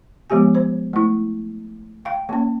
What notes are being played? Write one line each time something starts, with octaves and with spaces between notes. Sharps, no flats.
F3 G#3 B3 G4 G#5
C5
A3 E4
F5 G5
A#3 C#4